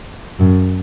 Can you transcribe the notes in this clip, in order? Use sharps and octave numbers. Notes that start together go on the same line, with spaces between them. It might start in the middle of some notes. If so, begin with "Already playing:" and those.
F#2